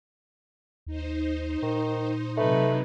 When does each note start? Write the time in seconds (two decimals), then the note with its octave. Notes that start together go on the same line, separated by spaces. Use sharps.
0.86 D#2 D#4 C5
1.62 A#2 D#3
2.37 C3 F#3 A3 D#4 B4